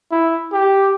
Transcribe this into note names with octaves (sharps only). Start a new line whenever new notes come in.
E4
G4